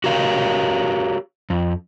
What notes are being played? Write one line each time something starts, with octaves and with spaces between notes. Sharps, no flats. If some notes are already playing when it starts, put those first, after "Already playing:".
F#4 G4 A#4 C#5 F5
F2